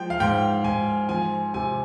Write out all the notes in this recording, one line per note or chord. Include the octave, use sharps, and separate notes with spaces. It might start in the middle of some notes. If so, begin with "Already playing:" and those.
Already playing: F3 G#3 G5
F5
G#2 G5
G#2 G#5
F3 G#5
C3 G#5